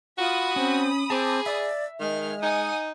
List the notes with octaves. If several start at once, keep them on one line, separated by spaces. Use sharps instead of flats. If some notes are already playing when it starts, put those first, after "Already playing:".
F4 F#4 B5 D#6
C4 C#4
C4 G#4 A5 D6
D5 E5
D#3 G#3 F6
D#4 F#5 G#5 D#6